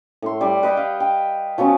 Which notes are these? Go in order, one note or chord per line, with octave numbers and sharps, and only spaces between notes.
A2 C6
G3 D5
B4 D#5 F#5 G5
F5
G5
F3 F#3 B3 C#4